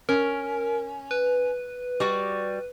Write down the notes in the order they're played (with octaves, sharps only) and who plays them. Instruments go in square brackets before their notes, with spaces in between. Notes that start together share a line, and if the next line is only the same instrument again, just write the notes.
[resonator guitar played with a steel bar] C#4 [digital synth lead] A#4
[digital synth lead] B4
[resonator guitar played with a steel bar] G3 F#4 D5